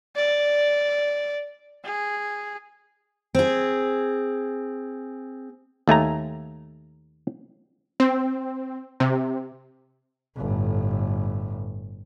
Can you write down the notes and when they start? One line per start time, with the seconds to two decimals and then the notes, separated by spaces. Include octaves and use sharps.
0.16 D5
1.85 G#4
3.35 C4 G#4
5.88 D#2 A3 G#5 A#5
8.00 C4
9.00 C3
10.36 G1 A2